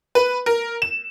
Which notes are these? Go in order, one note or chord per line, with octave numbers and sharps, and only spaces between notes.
B4
A#4
E7